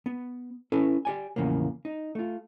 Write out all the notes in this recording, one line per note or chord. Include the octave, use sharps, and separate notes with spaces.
B3
C#4 E4 A4 B4
G4 D5 G#5
E2 A2 C#3 F3 A#3
D#4
A3 F4